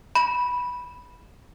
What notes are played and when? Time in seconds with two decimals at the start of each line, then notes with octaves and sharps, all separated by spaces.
0.15 B5